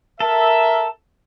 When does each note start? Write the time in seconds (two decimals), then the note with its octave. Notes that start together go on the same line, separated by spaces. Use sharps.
0.20 A4 A#4 E5